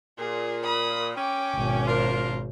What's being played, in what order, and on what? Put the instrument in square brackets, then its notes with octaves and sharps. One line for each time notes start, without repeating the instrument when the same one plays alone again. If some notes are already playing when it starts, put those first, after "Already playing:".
[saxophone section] A#2 [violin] G#4
[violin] B5 D#6
[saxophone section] C#4 [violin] G5 D6
[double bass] G#1 B2
[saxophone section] D4 F4 A#4 [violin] C5